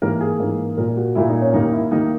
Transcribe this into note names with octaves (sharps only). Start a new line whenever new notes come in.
G#2 E3 A#3 A#4
G#4
G#2 E3 A#3
A#2 A#3 A#4
F#4
A#2 A#3 E4
D#4
C#4
D#2 D#3 A#3 D#4
E4
D#3 A#3 D#4